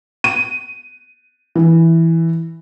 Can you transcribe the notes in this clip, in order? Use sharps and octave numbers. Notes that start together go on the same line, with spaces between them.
D#7
E3